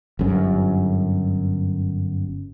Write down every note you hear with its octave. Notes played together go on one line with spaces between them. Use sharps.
G1 F#2